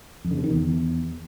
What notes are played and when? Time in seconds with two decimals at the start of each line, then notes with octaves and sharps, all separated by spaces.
0.24 F2
0.31 D3
0.37 C3
0.44 D#3
0.50 E2